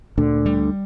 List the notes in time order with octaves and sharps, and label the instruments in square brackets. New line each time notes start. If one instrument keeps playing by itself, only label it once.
[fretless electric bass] D2 D3 [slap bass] A#2
[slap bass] G3